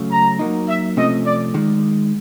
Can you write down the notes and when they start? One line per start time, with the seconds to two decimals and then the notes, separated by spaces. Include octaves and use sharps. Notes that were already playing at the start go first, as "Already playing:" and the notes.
Already playing: C#3 F#3 A3 C#4
0.11 A#5
0.39 F#3 A#3 D#4
0.68 E5
0.96 C3 F3 A3 C#4 D#5
1.25 D5
1.54 D#3 G#3